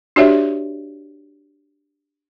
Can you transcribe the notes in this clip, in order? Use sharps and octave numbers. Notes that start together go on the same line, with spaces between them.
D4 F#4 G4 C#5 D5 E5